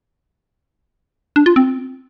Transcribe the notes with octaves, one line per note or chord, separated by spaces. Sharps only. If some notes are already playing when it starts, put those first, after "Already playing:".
D4
F4
C4